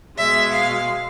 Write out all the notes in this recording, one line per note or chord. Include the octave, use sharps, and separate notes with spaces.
B2 G#3 E5
F5